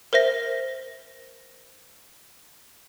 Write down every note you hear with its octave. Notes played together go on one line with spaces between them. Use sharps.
A#4 C5 E5 A#6